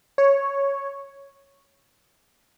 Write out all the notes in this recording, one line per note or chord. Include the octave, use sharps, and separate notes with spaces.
C#5